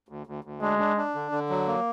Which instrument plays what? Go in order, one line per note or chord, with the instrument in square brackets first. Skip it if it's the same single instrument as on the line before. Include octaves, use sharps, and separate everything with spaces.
[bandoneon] D2
D2
D2
[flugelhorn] G#3 [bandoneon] D4
[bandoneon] D4
D4
D3
D3
F#3
A#3